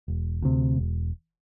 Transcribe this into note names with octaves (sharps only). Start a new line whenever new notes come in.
E1
D2 C3
E1